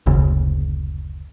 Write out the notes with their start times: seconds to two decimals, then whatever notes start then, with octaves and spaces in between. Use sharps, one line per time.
0.06 F#1 D2 C#3